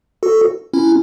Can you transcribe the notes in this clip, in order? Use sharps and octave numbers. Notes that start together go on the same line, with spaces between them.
F#4 A4
C#4 E4